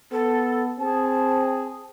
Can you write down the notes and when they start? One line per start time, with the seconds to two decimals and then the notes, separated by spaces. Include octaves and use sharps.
0.12 B3 A4
0.79 C4 G#4 A5